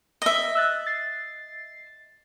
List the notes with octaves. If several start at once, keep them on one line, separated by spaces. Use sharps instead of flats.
D#5 E5
E6 F#6 A6
A6 C7